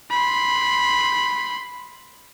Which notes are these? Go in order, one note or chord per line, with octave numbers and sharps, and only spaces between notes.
B5 C6